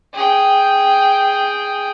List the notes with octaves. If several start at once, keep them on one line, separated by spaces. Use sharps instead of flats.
G#4 G5